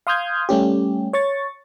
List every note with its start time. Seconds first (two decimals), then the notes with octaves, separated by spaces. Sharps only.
0.07 F5 C6 D#6 F6 G6 G#6
0.49 G3 A3 C#4 G4
1.13 C#5 C#6 A6